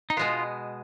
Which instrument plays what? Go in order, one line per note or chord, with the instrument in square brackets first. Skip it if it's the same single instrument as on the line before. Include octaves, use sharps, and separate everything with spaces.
[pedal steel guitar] D#4
[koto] B2 G#3 B3 [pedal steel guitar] F4